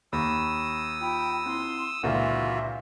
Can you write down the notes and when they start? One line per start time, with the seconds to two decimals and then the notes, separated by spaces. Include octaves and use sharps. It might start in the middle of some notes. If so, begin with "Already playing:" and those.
0.13 D#2 B5 C#6 D#6 E6
1.01 F4 G5 B5
1.46 C4 E4 C6
2.03 C#2 A#2 D3 E3 F4 F#4 A#4 E5